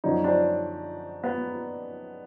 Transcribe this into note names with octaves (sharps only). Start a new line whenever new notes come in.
F#2 D3 F3 C#4 D#4
C4 D4
B3